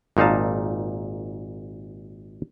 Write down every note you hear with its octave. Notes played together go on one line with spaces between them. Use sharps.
G#1 A#2 D#4 F5 A5